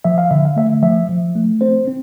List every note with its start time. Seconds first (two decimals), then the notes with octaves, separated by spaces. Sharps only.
0.04 F3 E5
0.18 F5
0.31 D3 E5
0.45 F5
0.56 A3 E5
0.83 F3 E5
1.09 F3
1.35 A3
1.61 C4 C5
1.87 C4